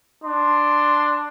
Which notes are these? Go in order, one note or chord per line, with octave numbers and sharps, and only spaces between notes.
D4 C6